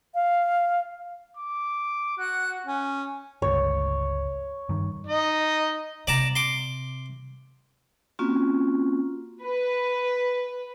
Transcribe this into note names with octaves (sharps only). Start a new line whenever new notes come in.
F5
D6
F#4 F#5 F#6
C#4
G1 C#2 C#5
G2 D#3
D#4 D#5
C3 D5 A5 A#5
C6 D6
A#3 C4 C#4 F4 F#4
B4